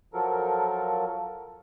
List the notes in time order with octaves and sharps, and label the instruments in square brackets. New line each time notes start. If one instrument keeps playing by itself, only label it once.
[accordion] F3 F#3 A4 A#4